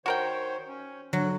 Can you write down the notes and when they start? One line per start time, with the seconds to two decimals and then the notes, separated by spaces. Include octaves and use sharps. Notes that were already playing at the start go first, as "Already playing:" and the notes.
0.06 D#3 F#4 A#4 C5 C#5 G5
0.67 C#4
1.13 D3 F#3 F#6